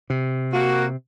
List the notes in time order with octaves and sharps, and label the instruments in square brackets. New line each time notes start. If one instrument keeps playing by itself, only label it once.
[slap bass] C3
[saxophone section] A#3 F#4